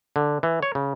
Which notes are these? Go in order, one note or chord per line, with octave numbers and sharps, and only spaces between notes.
D3
E3
C#5
C#3